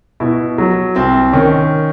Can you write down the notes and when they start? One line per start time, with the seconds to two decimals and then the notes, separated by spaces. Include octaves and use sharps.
0.20 B2 E4
0.58 F#3
0.96 C2 C4
1.33 D#3 C#4